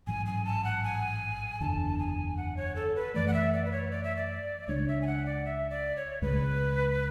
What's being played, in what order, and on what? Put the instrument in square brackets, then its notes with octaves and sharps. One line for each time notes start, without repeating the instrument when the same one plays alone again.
[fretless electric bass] A1 G#2 F#3 [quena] G#5
[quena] G#5
A5
F#5
G#5
[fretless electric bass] F#1 E2 D3 [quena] A5
[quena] G#5
F#5
C#5
A4
B4
[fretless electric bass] F#2 E3 A3 [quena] D5
[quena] F#5
E5
D5
B4
C#5
D5
E5
D5
[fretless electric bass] C#2 C#3 G#3 D4 [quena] C#5
[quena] E5
G#5
F#5
D5
E5
D5
C#5
[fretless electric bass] C#2 C#3 G#3 [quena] B4